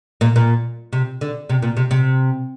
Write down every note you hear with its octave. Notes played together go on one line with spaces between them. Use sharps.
A#2
A#2
C3
D3
C3
A#2
C3
C3